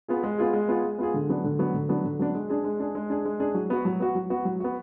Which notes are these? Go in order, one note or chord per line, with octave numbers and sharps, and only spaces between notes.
B3 F4 G#4
G#3
B3 F4 G#4
G#3
B3 F4 G#4
G#3
B3 F4 G#4
D3
F#3 B3 D4
D3
F#3 B3 D4
D3
F#3 B3 D4
D3
F#3 B3 D4
G#3
D4 G#4
G#3
D4 G#4
G#3
D4 G#4
G#3
D4 G#4
F#3
B3 F#4
F#3
B3 F#4
F#3
B3 F#4
F#3
B3 F#4